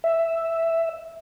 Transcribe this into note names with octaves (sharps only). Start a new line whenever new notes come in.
E5